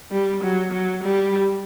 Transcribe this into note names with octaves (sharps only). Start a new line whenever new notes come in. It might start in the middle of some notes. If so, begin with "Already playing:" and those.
G3
F#3
F#3
G3